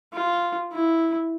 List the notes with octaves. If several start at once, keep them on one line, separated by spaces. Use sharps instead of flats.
F4
E4